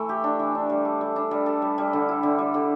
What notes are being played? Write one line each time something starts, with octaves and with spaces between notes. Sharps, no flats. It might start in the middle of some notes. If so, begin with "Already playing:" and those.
Already playing: E3 A3
G4
D4
E3
D4
G3
A4
G3
D4
G3
A4
G3
G3
D3
E4
D3
G3
D3